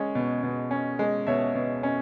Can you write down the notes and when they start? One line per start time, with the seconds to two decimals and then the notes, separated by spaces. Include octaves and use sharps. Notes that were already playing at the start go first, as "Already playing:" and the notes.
Already playing: G#3 C#4 C#5
0.15 B2
0.43 B2
0.71 C#4
0.99 G#3
1.27 B2 C#5 E5
1.55 B2
1.83 C#4